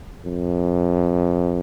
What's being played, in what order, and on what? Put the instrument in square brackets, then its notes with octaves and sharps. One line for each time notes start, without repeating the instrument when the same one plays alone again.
[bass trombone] F2